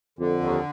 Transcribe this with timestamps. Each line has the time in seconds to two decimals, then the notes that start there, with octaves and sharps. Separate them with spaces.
0.19 F2 D3
0.41 D#2